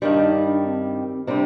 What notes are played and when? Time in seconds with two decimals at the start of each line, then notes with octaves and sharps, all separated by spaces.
0.02 G2 D#3 G3 D4
0.23 D#4
0.44 D4
0.65 C4
1.27 C3 G3 C4 D4